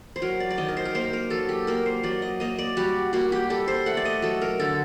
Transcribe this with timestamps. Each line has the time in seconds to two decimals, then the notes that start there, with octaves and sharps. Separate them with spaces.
0.16 C5
0.22 F#3 A#4
0.40 D5
0.50 D5
0.57 D#3 D#5
0.68 A#4
0.77 C5
0.85 A#4
0.95 A#3 C5
1.13 A#4
1.30 F#3 A4
1.49 G4
1.67 A#3 A#4
1.86 C5
2.03 F#3 D5
2.22 D#5
2.40 A#3 D#5
2.59 D5
2.77 G3 F#4
3.13 A#3 F#4
3.32 G4
3.50 G3 A4
3.68 C5
3.86 A3 F#5
3.97 D5
4.05 D#5
4.22 F#3 A4
4.41 A#4
4.59 D3 A4